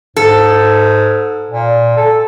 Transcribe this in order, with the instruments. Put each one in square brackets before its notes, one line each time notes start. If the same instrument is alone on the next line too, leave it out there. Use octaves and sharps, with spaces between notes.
[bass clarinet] G#2 [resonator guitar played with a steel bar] A4
[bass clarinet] A#2
A4